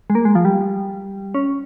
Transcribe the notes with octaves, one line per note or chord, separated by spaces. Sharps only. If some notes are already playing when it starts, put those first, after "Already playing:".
G#3
A#3
G#3
F3
G3
C#4